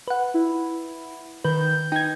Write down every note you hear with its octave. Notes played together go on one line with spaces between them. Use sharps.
B4 F#5
E4
D#3 B4 G6
D#4 G5 G#6